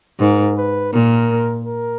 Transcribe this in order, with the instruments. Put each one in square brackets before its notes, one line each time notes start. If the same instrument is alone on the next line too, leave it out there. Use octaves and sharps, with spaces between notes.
[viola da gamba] G#2 [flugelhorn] A#4
[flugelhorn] B4
[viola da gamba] A#2 [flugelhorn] A#4
[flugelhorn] A#4